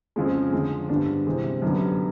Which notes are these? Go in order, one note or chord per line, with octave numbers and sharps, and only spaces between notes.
F2 C#3 F3 G#3 C#4
D3 F3 G#3
G2 D3 G3 B3 D4
C3 E3 G#3 C4
F#2 D3 G3 B3